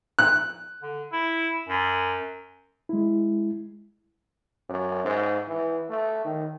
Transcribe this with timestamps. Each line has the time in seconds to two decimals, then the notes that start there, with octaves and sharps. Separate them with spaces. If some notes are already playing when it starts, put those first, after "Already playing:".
0.19 F#6
0.82 D3
1.12 E4
1.69 F#2
2.89 G#3 E4
4.69 F#2
5.05 G#2
5.48 E3
5.90 A3
6.25 D#3